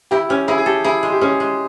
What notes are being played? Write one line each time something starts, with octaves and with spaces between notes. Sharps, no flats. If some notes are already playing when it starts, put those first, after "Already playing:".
E4 G4
C#4 G4
E4 G#4
G#4
G4 A4
E4 G#4
G#3
G4
C#4 G#4
G#3